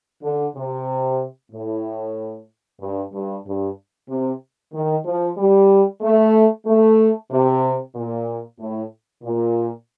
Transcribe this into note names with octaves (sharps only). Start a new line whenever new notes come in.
D3
C3
A2
G2
G2
G2
C3
D#3
F3
G3
A3
A3
C3
A#2
A2
A#2